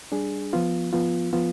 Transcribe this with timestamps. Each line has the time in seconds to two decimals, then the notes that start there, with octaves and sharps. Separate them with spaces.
0.12 G3 D4 G#4
0.53 F3 B3 F4
0.93 F3 B3 F4
1.33 F3 B3 F4